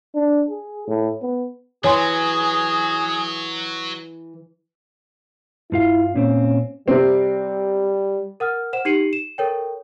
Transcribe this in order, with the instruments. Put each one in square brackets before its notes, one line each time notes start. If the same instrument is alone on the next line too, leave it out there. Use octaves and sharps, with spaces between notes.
[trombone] D4
G#4
A2
B3
[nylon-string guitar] E3 [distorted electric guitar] F#3 [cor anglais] G#4 [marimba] C#5 G#5 C6
[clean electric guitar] G2 F4 F5 [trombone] E4
[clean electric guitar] A#2 C4 [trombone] C#4
[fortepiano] C3 C4 [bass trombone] G3
[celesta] A#4 F#5 D#6 F6
C5 F#5 E7
D#4 G4 C7 C#7 D#7 F#7
E7
A4 A#4 C#5 G5